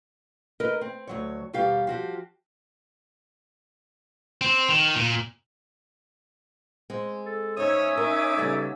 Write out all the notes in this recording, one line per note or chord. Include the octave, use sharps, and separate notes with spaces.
D#4 A#4 B4 D#5
C4
D2 F#3 C#5
D#2 B2 G3 G4 F5
F3 F#4 G4
C4
D#3
A#2
G#3 C4
A4
G#2 C#4 D#4 C#5 E5 D#6 E6
D#4 A#4 D6
C#3 G3 B3 A4